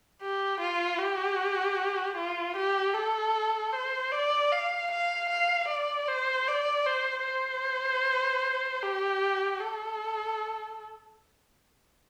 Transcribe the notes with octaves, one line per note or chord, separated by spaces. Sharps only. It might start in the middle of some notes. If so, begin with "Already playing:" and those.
G4
F4
G4
F4
G4
A4
C5
D5
F5
F5
F5
D5
C5
D5
C5
C5
G4
A4